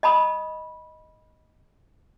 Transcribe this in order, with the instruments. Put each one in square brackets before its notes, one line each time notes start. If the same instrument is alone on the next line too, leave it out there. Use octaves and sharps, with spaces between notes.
[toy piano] D#5 A5 B5 D#6